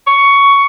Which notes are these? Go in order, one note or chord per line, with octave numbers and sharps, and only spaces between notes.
C#6